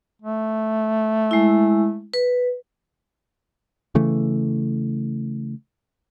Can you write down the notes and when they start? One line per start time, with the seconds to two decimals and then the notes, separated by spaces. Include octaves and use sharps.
0.22 A3
1.31 G#3 E4
2.14 B4
3.95 C#3 E3 A3